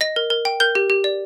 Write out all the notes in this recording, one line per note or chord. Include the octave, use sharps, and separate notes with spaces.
D#5 A#6
A#4
A#4
G5
A#4 G6
G4
G4
D5